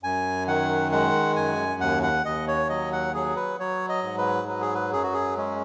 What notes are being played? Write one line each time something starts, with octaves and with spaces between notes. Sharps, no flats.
F#2 G#5
D#3 F#5
G#3 F#5
F#2 G#5
D#2 F#5
F#5
D#2 D#5
C#5
F#3 D#5
F#5
F#3 G#4
B4
F#3 C#5
D#5
G#2
B4
F#3 B4
G#4
B4
F#2 G#4
F#4
G#4
G#3 C#4